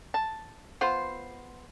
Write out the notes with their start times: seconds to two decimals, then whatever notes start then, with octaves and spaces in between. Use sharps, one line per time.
0.14 A5
0.81 B3 F4 C5